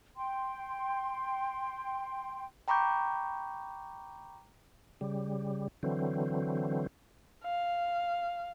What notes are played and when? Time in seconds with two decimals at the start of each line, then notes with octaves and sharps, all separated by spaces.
0.16 G5 C6
2.68 G5 A#5 B5 C#6 D6 G6
5.01 C#3 G3
5.83 D3 E3 F#3 C4
7.44 F5